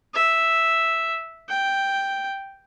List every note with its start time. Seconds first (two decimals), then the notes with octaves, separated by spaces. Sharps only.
0.14 E5
1.49 G5